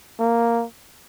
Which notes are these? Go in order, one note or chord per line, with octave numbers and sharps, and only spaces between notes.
A#3